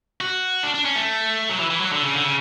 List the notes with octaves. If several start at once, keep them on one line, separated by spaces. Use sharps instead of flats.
F#4
D4
D4
C#4
A3
F#3
E3
E3
F#3
D3
C#3
D3
C#3